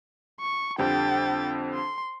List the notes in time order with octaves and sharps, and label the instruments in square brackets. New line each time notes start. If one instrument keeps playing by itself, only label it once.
[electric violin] C#6
[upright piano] F2 D3 G3 [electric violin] G5 A6
[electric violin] C6